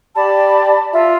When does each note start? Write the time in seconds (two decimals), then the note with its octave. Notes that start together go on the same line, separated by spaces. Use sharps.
0.15 G4 D5 A5 B5
0.92 F4 E5